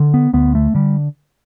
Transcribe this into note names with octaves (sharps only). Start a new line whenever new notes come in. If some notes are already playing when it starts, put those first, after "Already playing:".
Already playing: D3
B3
D2 B3
A3
D3 G3